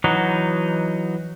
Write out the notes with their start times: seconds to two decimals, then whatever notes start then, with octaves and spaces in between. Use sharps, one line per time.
0.04 E3 F#3 D#4 F#4